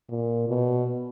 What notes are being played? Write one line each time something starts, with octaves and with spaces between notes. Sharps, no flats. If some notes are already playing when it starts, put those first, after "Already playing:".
A#2
B2